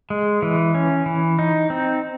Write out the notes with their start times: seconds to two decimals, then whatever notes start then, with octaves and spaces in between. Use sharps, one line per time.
0.10 G#3
0.42 E3
0.75 C#4
1.06 E3
1.39 D#4
1.70 C4